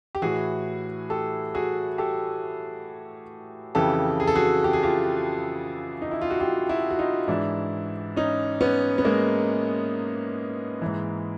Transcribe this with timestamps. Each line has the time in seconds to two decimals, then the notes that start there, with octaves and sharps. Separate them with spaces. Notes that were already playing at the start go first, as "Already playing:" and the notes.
0.15 G4
0.22 A2 E3 F#4 G#4
1.10 G4 A4
1.55 F#4 G#4
1.98 G4 A4
3.75 F2 C#3 E3 G4 A4
4.20 G#4
4.27 A4
4.35 F#4 G#4
4.64 G4
4.73 G#4
4.83 F4 G4
6.02 D#4
6.11 E4
6.21 F4
6.30 F#4
6.40 F4 G4
6.69 E4 F#4
6.90 F#4
6.99 D#4 F4
7.28 G#2 E3 D4 E4
8.16 C#4 D#4
8.61 B3 C#4
8.98 B3
9.05 G#3 A#3
10.82 G#2 E3